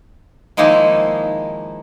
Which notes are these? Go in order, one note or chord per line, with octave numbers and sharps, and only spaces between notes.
D#3 F3 G#3 A#3 D#4 E4